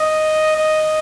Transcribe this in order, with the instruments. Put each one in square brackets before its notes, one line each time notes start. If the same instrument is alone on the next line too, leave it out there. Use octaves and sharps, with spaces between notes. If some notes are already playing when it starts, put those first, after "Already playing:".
Already playing: [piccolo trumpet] D#5
D#5